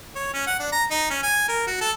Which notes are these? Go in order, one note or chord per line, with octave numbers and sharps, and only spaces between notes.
C#5
C#4
F#5
D4
A#5
D#4
C#4
G#5
A#4
F#4
A4